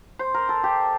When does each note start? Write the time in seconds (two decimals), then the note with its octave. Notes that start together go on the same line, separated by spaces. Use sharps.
0.19 C5
0.34 A#4
0.49 A4
0.64 G4